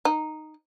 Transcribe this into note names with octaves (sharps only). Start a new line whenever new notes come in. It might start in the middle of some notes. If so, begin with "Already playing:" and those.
D#4